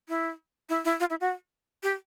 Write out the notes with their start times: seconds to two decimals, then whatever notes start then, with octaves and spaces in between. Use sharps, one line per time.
0.09 E4
0.69 E4
0.85 E4
1.00 F4
1.10 E4
1.21 F#4
1.83 G4